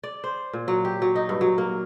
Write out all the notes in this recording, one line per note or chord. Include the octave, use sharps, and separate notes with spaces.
D5
C5
A#2
F#3
G4
F#3
D#4
G2
F#3
A#3